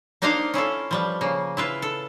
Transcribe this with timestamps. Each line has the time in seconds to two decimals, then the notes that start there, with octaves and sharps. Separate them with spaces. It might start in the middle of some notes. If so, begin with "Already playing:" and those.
0.22 A#3 D4 D#4 C5 D#5 F5
0.54 C#4 E4 F4 A4
0.91 F3 G3 B4
1.21 C#3 A#3
1.57 E4 F4 B4
1.82 A4